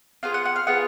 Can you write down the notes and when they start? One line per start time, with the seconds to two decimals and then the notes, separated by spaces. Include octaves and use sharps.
0.23 B3 F4 G#4 F5
0.34 F#5
0.45 F#5
0.56 F5
0.67 B3 F4 G#4 F#5